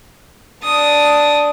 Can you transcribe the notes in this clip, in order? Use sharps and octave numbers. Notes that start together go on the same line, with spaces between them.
D4 D#6